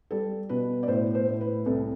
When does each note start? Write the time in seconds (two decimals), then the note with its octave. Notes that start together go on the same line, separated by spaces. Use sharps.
0.11 G3 A4
0.49 B2 B4
0.83 D5
0.88 A2 C5
1.15 C5
1.27 A2
1.41 B4
1.66 C2 A4